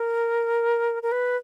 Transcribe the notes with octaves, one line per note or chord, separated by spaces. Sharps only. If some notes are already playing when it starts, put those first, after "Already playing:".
Already playing: A#4
A#4
B4